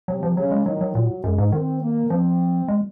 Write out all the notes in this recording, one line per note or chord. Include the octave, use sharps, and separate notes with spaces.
C3 F#3
F3
C#3 F#3
G#3
D#3 F#3
F#3
A#2 F#3
F#2 G#3
G#2
D#3 C4
A#3
F3 C4
G#3